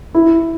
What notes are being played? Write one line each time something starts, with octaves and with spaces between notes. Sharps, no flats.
E4